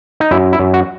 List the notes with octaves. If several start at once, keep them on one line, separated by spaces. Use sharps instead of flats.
D#4
F#2 E4
E4
F#2
F#4